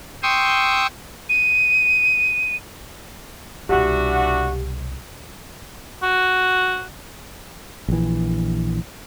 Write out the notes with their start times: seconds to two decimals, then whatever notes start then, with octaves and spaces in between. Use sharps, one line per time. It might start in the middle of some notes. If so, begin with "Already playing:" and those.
0.23 G5 C6 C#6 D#6 E6
1.29 D#7
3.69 C2 B2 E3 D4 F#4 G4
6.03 F#4
7.88 A#1 E3